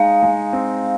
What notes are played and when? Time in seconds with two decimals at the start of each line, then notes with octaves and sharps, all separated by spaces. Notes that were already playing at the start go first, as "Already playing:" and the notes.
Already playing: G#3 D#4 F5
0.22 G#3
0.53 C4